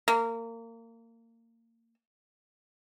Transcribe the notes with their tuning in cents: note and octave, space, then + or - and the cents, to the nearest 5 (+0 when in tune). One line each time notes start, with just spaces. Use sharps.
A#3 -25